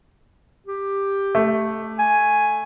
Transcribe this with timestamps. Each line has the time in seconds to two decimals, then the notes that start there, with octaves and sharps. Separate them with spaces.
0.67 G4
1.35 A3
1.99 G#5